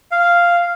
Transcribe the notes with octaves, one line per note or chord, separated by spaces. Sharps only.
F5